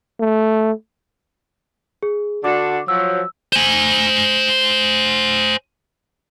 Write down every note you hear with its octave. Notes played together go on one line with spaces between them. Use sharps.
A3
G#4
D3 D4 F#4 D6
F3 F#3 E6
C5 G#5